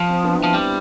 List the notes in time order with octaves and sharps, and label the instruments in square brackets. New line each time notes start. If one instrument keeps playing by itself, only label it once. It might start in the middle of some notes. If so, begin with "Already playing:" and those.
Already playing: [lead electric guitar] F3
[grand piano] C4
B3 D4
[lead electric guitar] F3 [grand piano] C4 E4
[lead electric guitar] G3